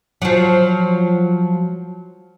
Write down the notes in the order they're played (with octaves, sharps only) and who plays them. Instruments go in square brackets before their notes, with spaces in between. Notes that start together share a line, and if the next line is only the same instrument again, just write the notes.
[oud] F3 F#3